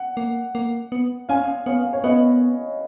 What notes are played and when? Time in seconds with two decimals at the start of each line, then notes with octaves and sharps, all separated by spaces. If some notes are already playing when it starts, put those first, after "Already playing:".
Already playing: F#5
0.17 A#3
0.55 A#3
0.92 B3
1.29 C#4 F5 G#5
1.66 B3 C#5 F5
1.93 C#5
2.04 B3 B4 D#5